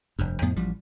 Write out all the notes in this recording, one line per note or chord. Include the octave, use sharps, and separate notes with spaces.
F1 G2
F2 A2 B3
A1 F3 G3